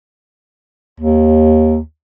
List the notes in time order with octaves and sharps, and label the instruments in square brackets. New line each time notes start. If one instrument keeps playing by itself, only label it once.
[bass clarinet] D#2